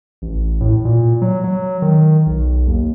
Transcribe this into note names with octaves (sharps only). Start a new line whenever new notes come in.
A1
A2
A#2
F#3
F#3
D#3
B1
D#2